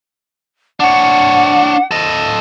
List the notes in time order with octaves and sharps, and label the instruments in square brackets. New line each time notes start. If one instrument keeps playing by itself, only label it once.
[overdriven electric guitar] D4 C#5 [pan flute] F#5
[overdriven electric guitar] A4 D#5